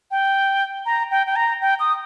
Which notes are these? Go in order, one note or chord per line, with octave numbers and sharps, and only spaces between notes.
G5
A#5
G5
G5
A#5
G5
D#6